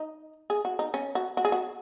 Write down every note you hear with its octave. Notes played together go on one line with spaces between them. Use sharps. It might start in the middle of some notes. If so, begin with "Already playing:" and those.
Already playing: D#4
G#4
F#4
D#4
C#4
F#4
F#4
G#4
F#4